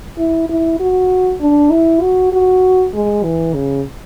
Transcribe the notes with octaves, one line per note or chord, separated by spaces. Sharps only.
E4
E4
F#4
D4
E4
F#4
F#4
G#3
E3
C#3